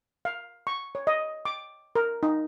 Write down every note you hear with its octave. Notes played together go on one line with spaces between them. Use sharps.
F5
C#6
C#5
D#5
D6
A#4
D#4